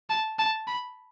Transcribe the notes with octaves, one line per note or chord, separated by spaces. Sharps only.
A5
A5
B5